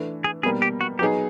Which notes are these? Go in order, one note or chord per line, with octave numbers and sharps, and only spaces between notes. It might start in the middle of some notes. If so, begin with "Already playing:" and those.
Already playing: E3 A3 D4
G#4
B2 G3 A#3 G#4
G4
F#4
F#3 B3 D#4 G4 G#4